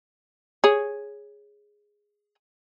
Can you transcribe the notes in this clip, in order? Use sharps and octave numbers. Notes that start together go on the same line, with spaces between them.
G#4 C#5